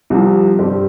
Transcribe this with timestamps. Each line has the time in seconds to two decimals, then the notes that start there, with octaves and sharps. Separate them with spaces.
0.10 C2 C3 F3
0.59 G2 G3 C4 G4